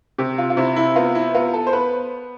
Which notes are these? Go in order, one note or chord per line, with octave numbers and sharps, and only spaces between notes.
C3 G4
F4
F4
C3 E4
E4
B3 F4
E4
B3 F4
A4
C5
B3 B4